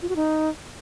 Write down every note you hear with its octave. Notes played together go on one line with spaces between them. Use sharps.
F4
F#4
D#4